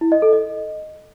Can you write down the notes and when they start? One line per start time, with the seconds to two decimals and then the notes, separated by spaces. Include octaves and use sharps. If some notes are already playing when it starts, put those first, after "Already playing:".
0.01 E4
0.12 D#5
0.22 A4
0.33 D#5